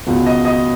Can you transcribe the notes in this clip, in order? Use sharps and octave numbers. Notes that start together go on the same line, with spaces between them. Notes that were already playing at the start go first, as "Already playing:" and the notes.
C#2 B2
D#5
D#5